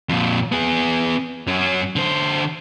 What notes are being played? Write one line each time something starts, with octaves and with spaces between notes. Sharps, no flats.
F2 A#2
B3 G#4
F#2 C#4
D3 C5